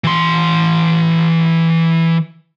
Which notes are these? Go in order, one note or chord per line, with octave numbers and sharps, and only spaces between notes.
E3 C6